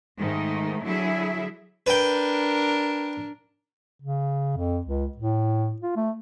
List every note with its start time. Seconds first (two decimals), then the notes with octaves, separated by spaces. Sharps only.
0.18 G#2 D#3 A3 D#4
0.83 D3 F#3 E4 G#4 E5
1.87 D4 A#4 B4 G5
4.02 C#3
4.57 F2
4.85 C#2
5.18 A2
5.82 F4
5.96 A3